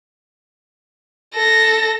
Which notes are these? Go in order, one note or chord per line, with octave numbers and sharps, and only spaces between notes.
A4 A#6